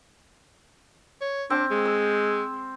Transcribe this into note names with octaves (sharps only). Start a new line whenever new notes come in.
C#5
C4 D4
G#3
E6